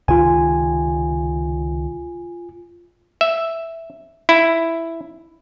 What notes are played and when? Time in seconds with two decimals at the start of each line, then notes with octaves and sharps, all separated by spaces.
0.08 C#2 C3 D#3 F4 G#5
3.21 E5
4.29 E4